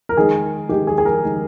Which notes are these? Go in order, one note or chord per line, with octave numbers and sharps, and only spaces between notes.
A#4
D#3 G#3 G#4
D#3 G#3 G4
G#4
G#4
A#4
D#3 G#3